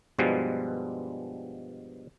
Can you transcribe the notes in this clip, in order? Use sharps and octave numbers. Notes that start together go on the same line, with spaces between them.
G2 B2 F3 G3 G#3